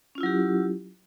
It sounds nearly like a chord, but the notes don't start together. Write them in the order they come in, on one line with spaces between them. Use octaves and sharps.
C#4 F4 E4 F#3 G4